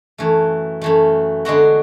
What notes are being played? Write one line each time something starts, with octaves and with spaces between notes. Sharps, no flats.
F#2 E3 A3
F#2 E3 A3
D3 G#3 B3 F#4